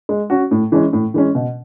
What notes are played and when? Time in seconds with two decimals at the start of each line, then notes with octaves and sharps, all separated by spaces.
0.09 G#3
0.30 C#4 F#4
0.51 A2
0.72 E3 G#3 C#4
0.93 A2
1.14 E3 G#3 C#4
1.35 B2